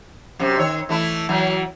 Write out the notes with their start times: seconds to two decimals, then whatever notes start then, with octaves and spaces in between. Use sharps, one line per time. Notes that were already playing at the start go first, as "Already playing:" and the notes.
0.39 F#2 C3
0.59 D#3 C#5
0.89 E3 A3 E4
1.29 E3 F#3